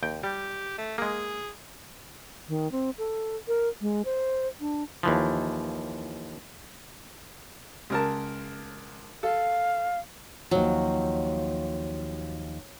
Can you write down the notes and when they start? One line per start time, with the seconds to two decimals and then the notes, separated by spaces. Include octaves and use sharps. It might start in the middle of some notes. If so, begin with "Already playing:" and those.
0.03 D#2 G5
0.24 G3 G4
0.78 A3
0.98 G#3 A#3 G#4
2.48 D#3
2.72 C4
2.98 A4
3.48 A#4
3.81 G#3
4.05 C5
4.60 D4
5.03 D#2 E3 F3
7.90 C#2 A#4 A5
9.23 A4 F5
10.51 D#2 F3 F#3